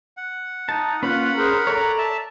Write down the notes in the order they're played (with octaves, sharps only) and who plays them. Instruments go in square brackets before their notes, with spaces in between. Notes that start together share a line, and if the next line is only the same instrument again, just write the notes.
[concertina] F#5
[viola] D#4 [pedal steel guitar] A5
[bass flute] A#3 [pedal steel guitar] C#4 B4 [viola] F4 [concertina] F#5 B5
[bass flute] G#4 [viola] A#4 C5
[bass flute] A4 [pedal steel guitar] C#5 D5 [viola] A#5
[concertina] E5 A5